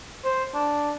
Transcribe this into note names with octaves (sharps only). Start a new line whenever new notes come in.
C5
D4